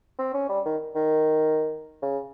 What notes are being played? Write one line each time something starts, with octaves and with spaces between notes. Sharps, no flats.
C4
C#4
G3
D#3
D#3
C#3